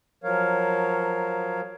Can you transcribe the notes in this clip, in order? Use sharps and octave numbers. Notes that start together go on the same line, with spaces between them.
F3 F#3 A#4 C#5 F5